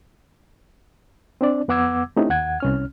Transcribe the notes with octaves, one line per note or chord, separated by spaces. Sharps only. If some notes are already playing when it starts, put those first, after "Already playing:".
C4 D4 D5
F2 B3 F#5 D6 E6 G#6
A3 C4 C#4 D#4 E4 G4
D#2 F#5 G#6
C2 C#4 F6